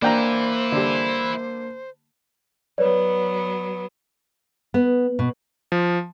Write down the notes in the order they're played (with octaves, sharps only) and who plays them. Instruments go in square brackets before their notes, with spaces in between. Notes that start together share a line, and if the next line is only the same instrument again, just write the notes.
[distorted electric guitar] E3 E4 [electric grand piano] A#3 [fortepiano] D4 G5 A#5 [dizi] C5
[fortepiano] D3 G3
[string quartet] F#3 B3 [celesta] B4 C#5 D5
[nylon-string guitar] B3
B2
[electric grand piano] F3